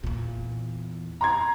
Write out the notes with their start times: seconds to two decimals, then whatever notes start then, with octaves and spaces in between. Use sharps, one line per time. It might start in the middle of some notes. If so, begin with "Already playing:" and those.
0.04 E2 A#2
1.21 A#5 C6 G#6